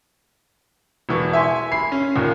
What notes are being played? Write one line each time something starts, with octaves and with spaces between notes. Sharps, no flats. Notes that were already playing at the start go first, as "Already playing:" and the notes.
E1 E3 C#6
E5 G#5 C6
B5 C7
C#4
D#2 A#2